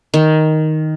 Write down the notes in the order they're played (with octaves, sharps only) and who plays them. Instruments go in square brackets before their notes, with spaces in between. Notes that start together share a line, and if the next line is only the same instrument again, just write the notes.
[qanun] D#3